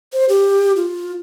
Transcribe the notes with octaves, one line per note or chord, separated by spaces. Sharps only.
C5
G4
F4